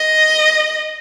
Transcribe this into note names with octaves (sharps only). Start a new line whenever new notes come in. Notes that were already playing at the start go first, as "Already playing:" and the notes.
Already playing: D#5